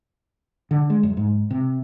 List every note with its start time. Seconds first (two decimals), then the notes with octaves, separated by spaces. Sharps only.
0.71 D3
0.90 G#3
1.03 F#2
1.17 G#2
1.51 C3